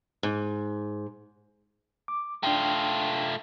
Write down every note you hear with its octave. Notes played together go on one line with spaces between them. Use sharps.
G#2
D6
A3 D4 F4 G5